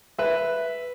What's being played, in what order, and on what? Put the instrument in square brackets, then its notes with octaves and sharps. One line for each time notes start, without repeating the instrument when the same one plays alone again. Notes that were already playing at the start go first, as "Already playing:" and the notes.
[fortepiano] B4 E5